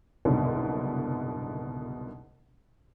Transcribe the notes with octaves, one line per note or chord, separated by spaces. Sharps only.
F#1 C2 G#2 B2 D3